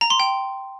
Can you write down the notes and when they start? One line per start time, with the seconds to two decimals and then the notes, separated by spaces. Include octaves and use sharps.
0.01 A#5
0.10 C6
0.20 G5